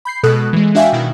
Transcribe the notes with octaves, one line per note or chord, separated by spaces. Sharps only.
B5 G6 C7
B2 G#3 A4 D#6 F#6
E3 G#3
D4 F#4 E5 F5 G5 G#5
B2 D#3 E4